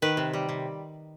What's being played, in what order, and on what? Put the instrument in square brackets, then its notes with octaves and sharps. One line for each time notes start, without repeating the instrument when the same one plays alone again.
[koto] D#3 B4
C3
G3
C3